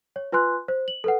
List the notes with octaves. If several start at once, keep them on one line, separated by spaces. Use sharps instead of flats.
C#5
F4 B4 G#5 C6 F#6
C5
F#7
A4 B4 F#5